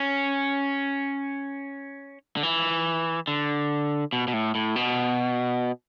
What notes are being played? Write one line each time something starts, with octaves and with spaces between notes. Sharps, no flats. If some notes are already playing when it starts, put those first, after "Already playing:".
Already playing: C#4
D3
E3
D3
B2
B2
A2
A2
B2